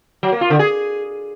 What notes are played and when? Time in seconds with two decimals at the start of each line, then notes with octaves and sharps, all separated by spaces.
0.23 F#3
0.32 A#3
0.41 F4
0.50 D3
0.59 G#4